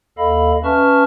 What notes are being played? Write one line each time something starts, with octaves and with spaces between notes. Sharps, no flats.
D#2 A4 D#5 F5 B5
C#4 B4 E5 A5 C#6 F6